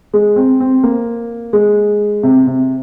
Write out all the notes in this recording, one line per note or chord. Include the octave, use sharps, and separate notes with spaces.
G#3
C4
C4
A#3
G#3
C3
C3